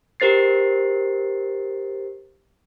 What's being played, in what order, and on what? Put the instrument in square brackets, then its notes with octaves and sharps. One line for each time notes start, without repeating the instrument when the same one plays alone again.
[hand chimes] G4 A#4 C5 A6 C7